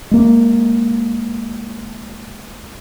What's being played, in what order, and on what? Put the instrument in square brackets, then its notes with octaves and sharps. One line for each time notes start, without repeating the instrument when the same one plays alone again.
[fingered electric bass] G#3 A#3